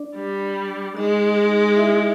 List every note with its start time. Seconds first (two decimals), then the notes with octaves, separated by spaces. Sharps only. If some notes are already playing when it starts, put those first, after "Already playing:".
Already playing: D4 D5
0.16 G3
0.96 G#3 D#4 D#5
1.36 D#4 D#5
1.76 E4 E5